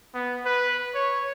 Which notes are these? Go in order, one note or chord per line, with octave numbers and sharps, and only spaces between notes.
B3
B4
C#5